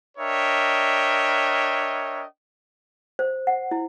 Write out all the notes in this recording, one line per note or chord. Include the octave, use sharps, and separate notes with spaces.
D4 A#4 C#5 D#5 E5 G5
C5
F#5
E4